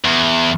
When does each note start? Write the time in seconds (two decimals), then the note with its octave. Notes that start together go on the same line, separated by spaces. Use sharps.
0.05 E2